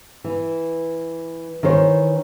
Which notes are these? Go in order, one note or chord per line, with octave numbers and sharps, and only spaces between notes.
E3
D#3 E3 C5 C#5